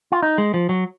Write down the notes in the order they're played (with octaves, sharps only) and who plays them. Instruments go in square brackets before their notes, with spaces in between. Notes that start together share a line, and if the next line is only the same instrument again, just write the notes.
[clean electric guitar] F4
D#4
G#3
F3
F#3